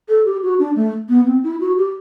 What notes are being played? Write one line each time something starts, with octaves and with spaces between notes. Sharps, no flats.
A4
G4
F#4
D4
A3
B3
C4
E4
F#4
G4